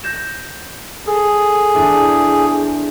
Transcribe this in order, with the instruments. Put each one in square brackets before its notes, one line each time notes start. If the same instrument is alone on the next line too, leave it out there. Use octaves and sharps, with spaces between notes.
[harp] G6 A#6 E7
[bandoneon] G#4 [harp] A4
[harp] E2 D4